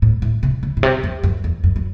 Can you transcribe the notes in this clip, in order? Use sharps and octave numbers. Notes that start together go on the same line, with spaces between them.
A2
A2
C3
C#3
A2
C3
F#2
F#2
E2
F#2
F#3